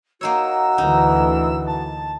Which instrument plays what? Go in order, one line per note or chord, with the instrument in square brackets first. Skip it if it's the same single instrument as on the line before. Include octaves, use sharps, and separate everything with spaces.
[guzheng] A#3 D#4 C#5 [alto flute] F#4 [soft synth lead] E6
[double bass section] D2 E3 [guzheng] D#4
[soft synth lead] A5